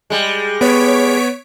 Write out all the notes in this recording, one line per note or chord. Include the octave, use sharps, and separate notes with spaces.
G3 G#3
B3 C#5 B6 D7